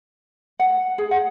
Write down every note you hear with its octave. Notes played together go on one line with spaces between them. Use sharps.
F#5
G#4
F#5